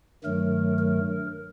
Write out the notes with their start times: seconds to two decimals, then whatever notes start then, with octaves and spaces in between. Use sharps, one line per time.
0.24 G2 D#3 F#3 A3 A#4
0.78 A#4